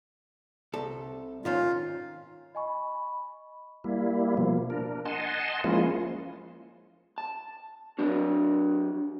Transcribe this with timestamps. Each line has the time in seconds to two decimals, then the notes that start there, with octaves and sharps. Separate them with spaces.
0.73 C2 A4
1.45 G#2 D#3 C#4 F4
2.55 D#5 G#5 B5 C#6
3.84 G3 A#3 E4
4.37 B2 F3 A#3
4.70 D4 A#4
5.05 D#5 F#5 G#5 A5 C6
5.64 F3 G#3 A#3 C#4 E4 F4
7.18 A5
7.99 F#3 D4 F#4